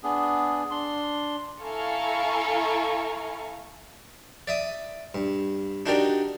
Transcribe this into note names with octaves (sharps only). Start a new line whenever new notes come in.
B3 D4 G#4
D4 C6
E4 A4 F5 G#5 A#5 C#6
D5 E5 D#6
G2
D4 D#4 F#4 G4 A#4 D5